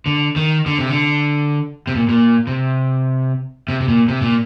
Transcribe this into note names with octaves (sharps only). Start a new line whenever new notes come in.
D3
D#3
D3
C3
D3
C3
A#2
A#2
C3
C3
C3
A#2
C3
A#2